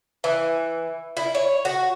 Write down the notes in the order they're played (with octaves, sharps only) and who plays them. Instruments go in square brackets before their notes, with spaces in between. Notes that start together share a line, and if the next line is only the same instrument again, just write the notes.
[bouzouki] E3
E4
C#5
F#4